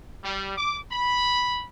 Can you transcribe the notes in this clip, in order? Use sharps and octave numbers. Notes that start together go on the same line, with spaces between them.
G3
D6
B5